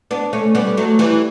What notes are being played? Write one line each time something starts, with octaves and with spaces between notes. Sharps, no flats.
B3 D4
A3 C#4
G3 B3
F#3 A3
E3 G3